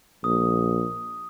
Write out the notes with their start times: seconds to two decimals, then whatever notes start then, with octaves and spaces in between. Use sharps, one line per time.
0.24 A#1 D#6